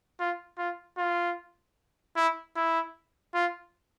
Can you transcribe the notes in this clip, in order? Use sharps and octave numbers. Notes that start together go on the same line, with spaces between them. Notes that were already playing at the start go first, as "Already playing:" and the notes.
F4
F4
F4
E4
E4
F4